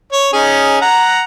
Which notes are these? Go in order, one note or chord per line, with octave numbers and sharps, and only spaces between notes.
C#5
C#4 D#4 G#4
F#5 A#5